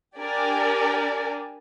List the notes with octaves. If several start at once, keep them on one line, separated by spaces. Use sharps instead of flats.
D4 G4 A#4 D5 G#5